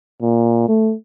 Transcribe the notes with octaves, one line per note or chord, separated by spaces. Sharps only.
A#2
A3